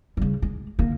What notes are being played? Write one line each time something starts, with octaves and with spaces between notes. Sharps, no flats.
C#3 G3
G#3
D3 A#3